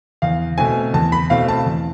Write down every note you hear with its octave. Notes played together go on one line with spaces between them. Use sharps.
E2 F5
B2 A3 C4 G#5
E2 A5
B5
B2 A3 C4 F5
A5
E2